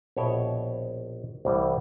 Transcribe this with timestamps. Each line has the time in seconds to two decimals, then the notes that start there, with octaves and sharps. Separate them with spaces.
0.17 A#1 B2 C#5 E5 G5
1.45 C2 A2 E3 G3